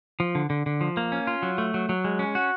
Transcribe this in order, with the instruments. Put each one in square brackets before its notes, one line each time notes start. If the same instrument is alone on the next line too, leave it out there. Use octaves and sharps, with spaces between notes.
[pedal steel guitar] F3
D3
D3
D3
F3
A#3
C#4
F4
F#3
A3
F#3
F#3
G#3
C#4
F#4